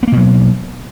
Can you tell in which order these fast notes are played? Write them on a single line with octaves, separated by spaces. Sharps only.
B3 A#3 B2 F#3